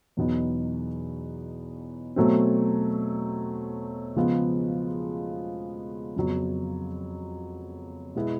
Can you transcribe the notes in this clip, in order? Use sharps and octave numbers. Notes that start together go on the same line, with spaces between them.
E2 B2 F#3 B3 D#4
B2 F#3 A3 C4
C#3 F3 G#3 B3
F2 C#3 F#3 B3
B2 G#3 B3 E4